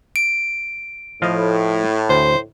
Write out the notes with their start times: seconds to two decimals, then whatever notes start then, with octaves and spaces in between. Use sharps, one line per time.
0.16 D7
1.22 A2 F3 D#5 F5
2.09 D2 C5